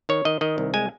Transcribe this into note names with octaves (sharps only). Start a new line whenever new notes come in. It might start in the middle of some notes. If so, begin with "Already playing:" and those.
D#3 C#5
D#3 D#5
D#3 D#5
C2
G#3 G#5